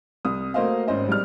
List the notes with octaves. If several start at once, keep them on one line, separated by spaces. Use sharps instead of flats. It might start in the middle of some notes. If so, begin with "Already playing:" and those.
C2 D#6
A3 A#3 F#4 C5 D#5 F5
G#1 C#4 C5 D#5
G#2 G3 G#3 D5 F6